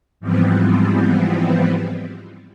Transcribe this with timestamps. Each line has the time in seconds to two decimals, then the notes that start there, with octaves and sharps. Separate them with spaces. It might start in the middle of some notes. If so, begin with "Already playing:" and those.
0.20 G#2 E3 F3 G3 B3 C4